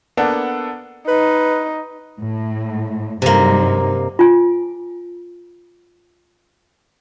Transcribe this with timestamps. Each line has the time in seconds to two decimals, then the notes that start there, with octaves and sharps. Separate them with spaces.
0.17 A#3 B3 D4 A4 F#5
1.08 D#4 B4
2.20 A2
3.22 G2 C3 F#3 A#3 D#4
4.19 F4 G#5